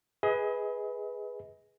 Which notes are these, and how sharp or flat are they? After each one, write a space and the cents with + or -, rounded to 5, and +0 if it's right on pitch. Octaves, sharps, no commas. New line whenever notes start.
G#4 +0 B4 +0 D#5 +40